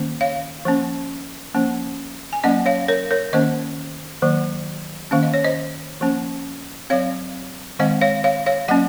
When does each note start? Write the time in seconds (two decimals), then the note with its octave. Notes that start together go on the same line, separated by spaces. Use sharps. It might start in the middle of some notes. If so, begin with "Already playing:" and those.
Already playing: D#3 A#3 C#4
0.21 C#5 F5
0.65 F3 A#3 C#4
1.55 F3 A#3 C#4
2.33 G#5
2.44 F#3 A#3 C#4 D#5 F#5
2.66 C#5 F5
2.88 A#4 C#5
3.11 A#4 C#5
3.33 D#3 A#3 C#4 C5 D#5
4.22 D#3 F#3 A#3
5.11 D#3 A#3 C#4 F5
5.23 D#5
5.34 C#5
5.44 C5 D#5
6.01 F3 A#3 C#4
6.90 F#3 C4 C#5 F5
7.79 D#3 G#3 C4 D#5 F#5
8.01 C#5 F5
8.24 C#5 F5
8.46 C#5 F5
8.68 F#3 A#3 C#4 D#5 F#5